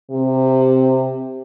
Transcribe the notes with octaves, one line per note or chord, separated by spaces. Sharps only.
C3